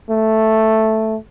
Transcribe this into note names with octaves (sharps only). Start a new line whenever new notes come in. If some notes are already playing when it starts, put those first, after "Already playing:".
A3